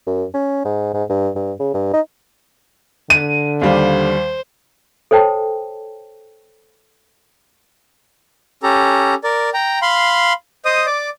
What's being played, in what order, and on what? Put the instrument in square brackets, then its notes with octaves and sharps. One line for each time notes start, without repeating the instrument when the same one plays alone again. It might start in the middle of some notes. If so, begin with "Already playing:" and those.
[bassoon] F#2
C#4
G#2
G#2
G2
G2
C#3
G2
D#4
[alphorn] D3 [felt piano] D#7
[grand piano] D#2 G3 F5 [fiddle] C5
[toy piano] A4 C5 C#5 G5 A5
[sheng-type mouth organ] C#4 G4 A4 A#5
A#4 D5
G5 A#5
F5 B5 C6
C5 D#5 D#6
D5 D6